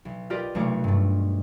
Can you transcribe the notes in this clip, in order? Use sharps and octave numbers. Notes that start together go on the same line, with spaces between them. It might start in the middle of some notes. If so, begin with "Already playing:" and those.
B1
F4 G4 A#4 B4 D5 D#5
F1 B1 A3 C#5 D6
G2 A3